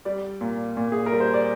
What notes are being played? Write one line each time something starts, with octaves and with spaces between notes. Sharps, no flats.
G3 D5
A#2
A#2
G#4
A#4
G3
C5
D5